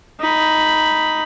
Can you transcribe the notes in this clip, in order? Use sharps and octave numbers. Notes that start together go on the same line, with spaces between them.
D#4 B5